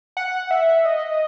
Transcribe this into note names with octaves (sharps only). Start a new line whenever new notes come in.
F#5
E5
D#5